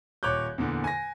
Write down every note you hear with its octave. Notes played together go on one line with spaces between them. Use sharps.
D#1 C#5 D6 F#6 G6
E2 A#2 D3
G#5 A#6